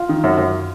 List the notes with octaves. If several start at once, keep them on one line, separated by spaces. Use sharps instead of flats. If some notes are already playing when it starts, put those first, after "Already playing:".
Already playing: F4
D#3
F#2
F#2